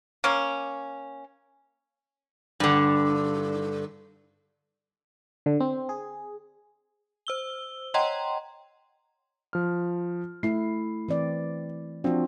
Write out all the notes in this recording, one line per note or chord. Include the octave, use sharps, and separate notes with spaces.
A#3 C#4
G2 D3
D3
C4
G#4
C5 E6 G7
C#5 D#5 F#5 G5 A#5 C6
F3 F6
A3 E4 C7
E3 C4 D5
F3 C4 D4 F#4